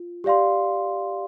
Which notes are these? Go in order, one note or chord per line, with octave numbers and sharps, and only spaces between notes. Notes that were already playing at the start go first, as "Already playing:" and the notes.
Already playing: F4
G4 D5 F5 C6